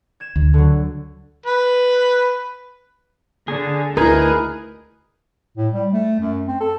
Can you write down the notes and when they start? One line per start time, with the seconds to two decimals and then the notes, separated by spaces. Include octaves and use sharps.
0.20 G#6 E7
0.36 D2
0.54 D3 F#3
1.46 B4
3.48 D3 G#4
3.97 D2 D#4 E4 G#4 A#4 B4 G#5
5.57 A2
5.73 G3
5.93 A3
6.20 F#2
6.48 C4
6.60 A4